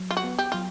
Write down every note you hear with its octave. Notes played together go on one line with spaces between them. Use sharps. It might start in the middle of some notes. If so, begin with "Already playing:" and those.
Already playing: F#3
F4
F#4
B3
G4
F#3 F4